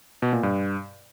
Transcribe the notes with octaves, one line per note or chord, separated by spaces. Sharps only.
B2
A#2
G2